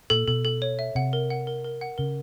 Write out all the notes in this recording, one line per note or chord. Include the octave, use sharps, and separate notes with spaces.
A#2 A4
B2 A4
A4
C#5
E5
C3 F#5
A#4
F#5
A#4
A#4
F#5
C#3 A#4